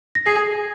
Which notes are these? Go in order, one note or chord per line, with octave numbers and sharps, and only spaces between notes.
A#6
G#4 C7